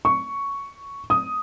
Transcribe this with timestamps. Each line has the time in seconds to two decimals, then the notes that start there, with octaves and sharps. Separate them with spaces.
0.05 C#6
1.10 D#6